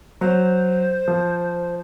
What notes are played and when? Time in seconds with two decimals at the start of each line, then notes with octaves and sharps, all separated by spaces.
0.21 F#3 C5
1.08 F3